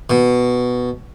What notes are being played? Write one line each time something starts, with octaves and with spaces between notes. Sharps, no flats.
B2